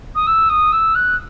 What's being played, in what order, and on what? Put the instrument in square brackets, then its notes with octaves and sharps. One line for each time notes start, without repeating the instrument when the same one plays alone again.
[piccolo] D#6
E6
D#6
E6
F#6